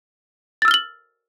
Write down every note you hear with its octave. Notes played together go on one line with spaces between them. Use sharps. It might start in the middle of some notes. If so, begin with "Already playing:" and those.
E6 F6 A6 F#7 G7